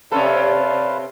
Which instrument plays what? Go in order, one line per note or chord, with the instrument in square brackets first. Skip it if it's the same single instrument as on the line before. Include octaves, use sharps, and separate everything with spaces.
[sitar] C3 C#4 A4 [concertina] B4 C5 F5 [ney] D5